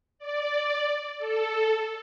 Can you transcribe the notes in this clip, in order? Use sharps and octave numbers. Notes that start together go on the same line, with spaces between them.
D5
A4